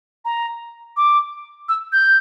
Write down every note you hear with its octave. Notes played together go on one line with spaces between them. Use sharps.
A#5
D6
E6
G6